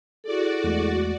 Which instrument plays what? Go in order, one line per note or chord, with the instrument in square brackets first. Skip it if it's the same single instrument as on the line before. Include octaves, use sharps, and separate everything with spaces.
[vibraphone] E4 G#4 A4 [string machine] F#4 D5
[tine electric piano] E2 G#3 A3